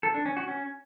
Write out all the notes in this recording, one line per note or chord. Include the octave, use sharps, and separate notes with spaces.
A4
D4
C#4
F#4
C#4